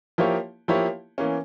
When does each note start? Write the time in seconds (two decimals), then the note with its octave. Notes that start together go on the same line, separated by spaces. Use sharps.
0.18 F3 A#3 E4 G4 C#5
0.68 F3 A#3 E4 G4 C#5
1.18 E3 A#3 C#4